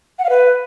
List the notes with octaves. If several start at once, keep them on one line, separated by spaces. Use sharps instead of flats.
F#5
F5
B4